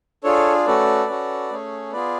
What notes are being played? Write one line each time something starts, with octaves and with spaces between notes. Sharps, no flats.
D4 F4 G#4 A4 C#5
A3 C#4 F#4 A4 B4 D5
C#4 F#4 A4
A3 C#4 G#4
B3 F4 G#4 B4 D5